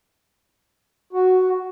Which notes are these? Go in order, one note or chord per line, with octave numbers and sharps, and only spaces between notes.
F#4